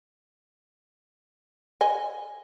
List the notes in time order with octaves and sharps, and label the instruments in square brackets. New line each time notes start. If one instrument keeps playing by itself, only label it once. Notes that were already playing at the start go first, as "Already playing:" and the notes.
[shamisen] D#5 G#5